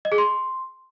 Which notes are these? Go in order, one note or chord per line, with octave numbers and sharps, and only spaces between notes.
D#5
G#4
C6